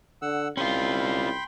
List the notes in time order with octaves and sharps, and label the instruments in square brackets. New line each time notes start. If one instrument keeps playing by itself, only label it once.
[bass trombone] D3 [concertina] F#5 E6
[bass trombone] C2 [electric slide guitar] C#4 F4 [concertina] G5 B5 C6